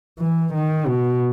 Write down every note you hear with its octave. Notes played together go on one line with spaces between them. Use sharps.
E3
D#3
B2